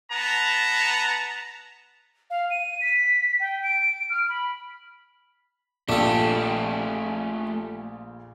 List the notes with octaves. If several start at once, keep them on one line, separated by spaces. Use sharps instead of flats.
B3 A5 A#5
F5
D#7
B6
G5
D7
F6
B5
A#1 A#2 A3 D4 G4 A4